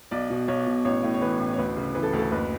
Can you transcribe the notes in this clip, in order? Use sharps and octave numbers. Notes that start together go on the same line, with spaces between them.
B1 D5
B2
B1 C#5
B2
A1 C#5
A2
C#5
E3 B4
A1
C#5
D2 B4
C#3
E3 B4
A4
D2
A4
F#1 B4